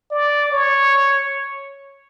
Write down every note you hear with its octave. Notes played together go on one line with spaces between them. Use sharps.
D5
C#5